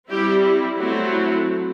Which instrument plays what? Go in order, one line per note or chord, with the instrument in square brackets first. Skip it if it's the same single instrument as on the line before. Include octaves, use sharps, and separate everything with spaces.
[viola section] G3 C4 E4 G4
F#3 A3 C4 E4